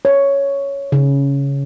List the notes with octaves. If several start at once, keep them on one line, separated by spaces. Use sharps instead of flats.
C#5
C#3